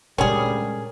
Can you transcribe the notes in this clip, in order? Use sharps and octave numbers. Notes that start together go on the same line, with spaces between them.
D2 A#2 C#3 G3 G#3 C#4 G#4 A#4